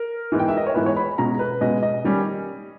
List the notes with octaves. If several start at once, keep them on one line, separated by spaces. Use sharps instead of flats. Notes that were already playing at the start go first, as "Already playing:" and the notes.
Already playing: A#4
G#2 E3 G#3 B3
G5
E5
D#5
C#5
G#2 E3 G#3 B3 B4
C#5
B5
B2 G#3 C#4 A#5
B4
B2 G#3 C#4 D#5
D#5
D#3 G3 C#4